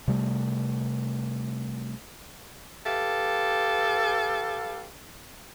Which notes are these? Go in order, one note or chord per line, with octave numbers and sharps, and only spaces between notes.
C3 G3 A3
G4 A4 B4 F5